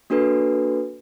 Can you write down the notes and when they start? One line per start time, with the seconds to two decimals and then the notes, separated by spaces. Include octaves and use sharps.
0.10 A#3 D4 F#4 A4 B4